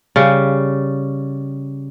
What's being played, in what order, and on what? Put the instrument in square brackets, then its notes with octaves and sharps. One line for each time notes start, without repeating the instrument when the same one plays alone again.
[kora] C#3 G3